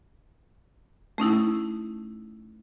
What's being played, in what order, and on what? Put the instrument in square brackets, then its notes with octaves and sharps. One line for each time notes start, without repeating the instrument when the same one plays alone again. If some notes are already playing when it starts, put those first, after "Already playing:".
[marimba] A3 C#4 D#4 E4